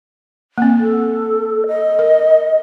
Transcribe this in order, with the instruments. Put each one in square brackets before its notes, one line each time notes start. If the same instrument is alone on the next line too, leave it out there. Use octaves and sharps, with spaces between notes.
[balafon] A#3 C4
[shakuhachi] A4
D#5
[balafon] A#4